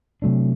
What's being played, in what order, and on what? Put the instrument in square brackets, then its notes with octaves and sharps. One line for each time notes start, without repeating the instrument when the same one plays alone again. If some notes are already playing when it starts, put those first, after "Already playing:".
[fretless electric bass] C3 F#3 A3 D4